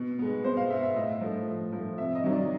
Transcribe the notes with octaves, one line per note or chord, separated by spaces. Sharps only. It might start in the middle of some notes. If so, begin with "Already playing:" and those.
Already playing: B2
G#3 B3
B2 C5
F5
G#3 B3 E5
E5
A2 D#5
F3 A3
A2
F3 A3
C3 E5
D#5
D#3 F#3
D5